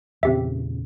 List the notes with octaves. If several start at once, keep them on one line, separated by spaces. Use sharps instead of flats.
E2 A#2 C#3 C4 G4 E5